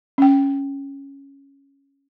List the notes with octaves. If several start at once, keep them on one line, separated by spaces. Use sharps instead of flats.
C#4 G5